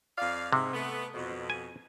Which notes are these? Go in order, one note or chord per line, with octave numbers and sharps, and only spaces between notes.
F2 D5 F5
G#2 C3
A3 B3
F2 B2
G#5